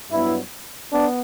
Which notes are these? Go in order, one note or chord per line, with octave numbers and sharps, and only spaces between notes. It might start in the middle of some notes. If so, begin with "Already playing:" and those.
G2 F#3 B3 E4
B3 D4